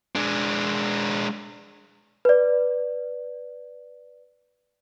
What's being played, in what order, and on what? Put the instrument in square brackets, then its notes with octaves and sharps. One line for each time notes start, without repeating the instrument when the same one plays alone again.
[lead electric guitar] G#3 D4
[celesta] B4 D5